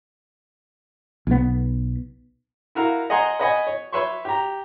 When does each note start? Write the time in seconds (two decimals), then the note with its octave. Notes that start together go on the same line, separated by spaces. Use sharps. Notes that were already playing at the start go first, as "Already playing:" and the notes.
1.27 B1 B3
2.75 E4 F#4 A#4 F5
3.10 D#5 F#5 G#5 A#5 C6
3.39 B4 C#5 D#5 F#5 G#5 B5
3.67 C#5
3.92 B4 C#5 E5 C6 C#6
4.25 G4 A#5